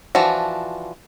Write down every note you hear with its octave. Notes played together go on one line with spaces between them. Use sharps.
E3 F3 D4 F#4